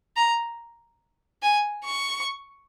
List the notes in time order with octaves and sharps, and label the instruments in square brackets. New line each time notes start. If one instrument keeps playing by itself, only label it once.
[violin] A#5
G#5
C#6